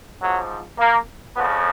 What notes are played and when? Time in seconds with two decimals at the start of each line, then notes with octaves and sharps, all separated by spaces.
0.21 G#2 F3 F#3
0.79 A#3
1.36 F2 C#3 F3 B3